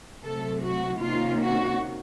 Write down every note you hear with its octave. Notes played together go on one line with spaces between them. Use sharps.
C3 F#3 A3 A4
F#4
C3 D#3 A#3 C#4 F4
F#4